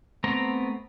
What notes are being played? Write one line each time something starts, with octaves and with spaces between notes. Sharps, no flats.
A3 B3 C4 A#5